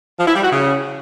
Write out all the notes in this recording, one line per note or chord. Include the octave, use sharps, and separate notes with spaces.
F3
E4
G3
F#4
C#3